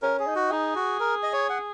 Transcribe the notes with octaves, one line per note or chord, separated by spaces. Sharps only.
C#4 A#4
G#4
D#4
F#4
D#4 G#4
F#4
A#4
D#5
C#5
F#5